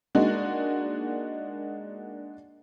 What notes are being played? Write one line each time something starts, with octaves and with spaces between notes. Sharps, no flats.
G#3 A#3 D4 D#4 F#4